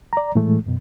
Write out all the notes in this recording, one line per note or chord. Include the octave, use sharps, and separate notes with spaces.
D5 A#5
A2 E3 G#3 A3
F#2 B2